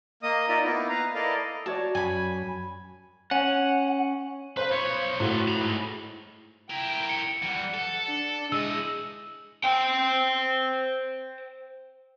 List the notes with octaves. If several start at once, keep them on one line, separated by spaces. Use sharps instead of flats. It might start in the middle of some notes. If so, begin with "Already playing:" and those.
A#3 D#5 D#6
D#4 F4 A#4 D5 E5
A#3 B3 D#4 E4
B4 F5 A#5
E4 A4 A#4 D5 D#5 F5
F#4 C#5 D5 A5
F#2 G#5 B5
C#4 F#5
B4 C5 F5
B1 C#5
A2 F4 F#4 B4
A#5 B5
G#2
E4 A#4 G5
C#7
E3 G3 F#5
A4
D4
E3 G#3 D#5 E6
C5 G5